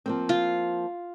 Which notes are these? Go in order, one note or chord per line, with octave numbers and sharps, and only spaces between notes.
F3 A#3 C4
F4